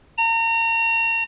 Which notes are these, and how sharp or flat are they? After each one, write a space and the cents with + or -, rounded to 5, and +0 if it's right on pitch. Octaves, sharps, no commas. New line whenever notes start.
A#5 -35